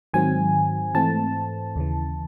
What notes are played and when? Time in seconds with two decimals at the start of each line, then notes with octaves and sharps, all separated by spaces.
0.13 G#2 D#3 F#3 C4 G#5
0.94 G#2 E3 A3 C4 A5
1.76 D#2 C#3 E3